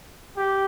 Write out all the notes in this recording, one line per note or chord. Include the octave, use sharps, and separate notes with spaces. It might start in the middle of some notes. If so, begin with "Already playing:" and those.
G4